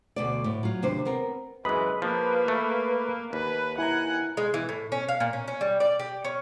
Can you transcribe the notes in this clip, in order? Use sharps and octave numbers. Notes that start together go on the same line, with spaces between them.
D2 B2 D5
A2
F#3 F4
D#2 C3 D4 C5
B3 C4 A#4
F#2 E3 G#3 B4 B5 D#6
F3 A#3
A3
D#2 B4
E4 F#5 G#5 A#5
G#3
E3
A2
C#4
F5
A#2
C#4
C#4
G3
D5
G4
C#4